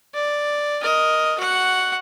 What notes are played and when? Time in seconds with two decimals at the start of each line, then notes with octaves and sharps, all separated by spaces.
0.14 D5
0.81 A#4 D#5
1.39 F#4 F#5